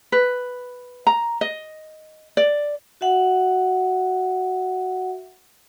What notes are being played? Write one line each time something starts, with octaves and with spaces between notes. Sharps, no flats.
B4
A#5
D#5
D5
F#4 E5 F#5